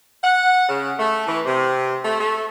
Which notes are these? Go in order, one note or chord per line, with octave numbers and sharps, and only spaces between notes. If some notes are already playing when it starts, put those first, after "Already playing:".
F#5
C#3
A3
E3
C3
A3
A3